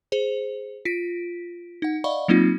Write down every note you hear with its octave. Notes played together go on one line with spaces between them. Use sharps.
G#4 C5
F4 B6 D7
D#4 F#5
D5 D#5 F5 F#5 B5 C#6
F#3 A#3 C4 D#4 F4